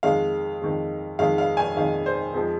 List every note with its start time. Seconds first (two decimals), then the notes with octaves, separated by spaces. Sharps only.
0.03 F2 D#3 G#3 F5
0.61 F2 D#3 G#3
1.19 F2 D#3 G#3 F5
1.38 F5
1.57 G#5
1.77 F2 D#3 G#3 F5
2.06 C5
2.34 F2 F3 G#3